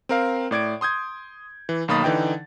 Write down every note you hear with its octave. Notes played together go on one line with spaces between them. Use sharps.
C4 A#4 F5
A2 D5 G#6 D7
C6 D#6 G6 G#6
E3
B1 D#3 A#3 B5 D#6 A6
D3 E3 D#4 G5